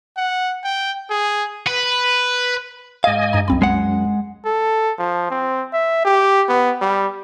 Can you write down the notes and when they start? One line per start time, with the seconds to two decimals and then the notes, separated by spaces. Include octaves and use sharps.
0.17 F#5
0.64 G5
1.10 G#4
1.67 B4
3.04 G#2 D#5 F5 G#5
3.33 G2 A#5
3.48 C2 F#2 C4 B5
3.62 G#3 F#5
4.45 A4
4.98 F3
5.31 C4
5.73 E5
6.05 G4
6.49 B3
6.82 G3